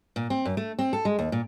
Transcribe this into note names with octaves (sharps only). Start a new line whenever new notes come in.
A#2
C4
F#2
A3
C4
A4
G#3
D#2
A#2